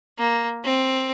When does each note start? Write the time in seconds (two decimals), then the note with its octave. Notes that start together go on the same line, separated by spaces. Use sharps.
0.18 A#3
0.64 C4